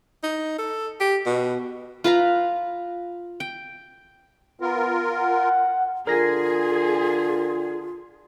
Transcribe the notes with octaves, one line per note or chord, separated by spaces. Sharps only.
D#4
A4
G4
B2
F4 B4 F5 A#5
G5
B3 F4 A#4
F#5
D3 F4 G#4 A#4 A#6